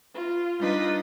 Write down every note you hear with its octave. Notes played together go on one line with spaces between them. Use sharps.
F4
G3 D4 D#4 F4 B4 D#5